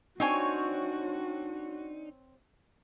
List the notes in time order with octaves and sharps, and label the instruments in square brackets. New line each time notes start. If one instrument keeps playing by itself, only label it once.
[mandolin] C4 C#5 G#5 [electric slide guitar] D4 D#4 [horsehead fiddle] F#4